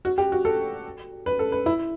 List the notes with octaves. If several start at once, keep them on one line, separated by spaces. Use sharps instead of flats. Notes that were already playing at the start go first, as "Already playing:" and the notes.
F#4
G4
F#4
A4
B4
A4
B4
E4